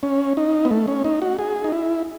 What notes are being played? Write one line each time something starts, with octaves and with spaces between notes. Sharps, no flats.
C#4
D#4
B3
A3
C#4
D#4
F#4
G#4
D#4
E4